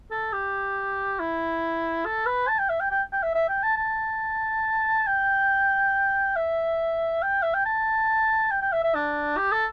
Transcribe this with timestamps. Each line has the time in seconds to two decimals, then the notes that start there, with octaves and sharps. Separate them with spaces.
0.11 A4
0.33 G4
1.19 E4
2.05 A4
2.26 B4
2.48 A5
2.59 G5
2.69 E5
2.80 G5
2.91 G5
3.12 G5
3.23 E5
3.34 E5
3.49 G5
3.63 A5
3.77 A5
5.07 G5
6.36 E5
7.22 G5
7.42 E5
7.54 G5
7.66 A5
8.51 G5
8.62 G5
8.72 E5
8.83 E5
8.95 D4
9.37 G4
9.52 A4